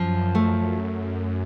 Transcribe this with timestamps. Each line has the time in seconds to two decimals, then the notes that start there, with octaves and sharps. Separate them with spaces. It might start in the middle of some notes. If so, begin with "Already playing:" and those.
Already playing: F#2 F3
0.35 A3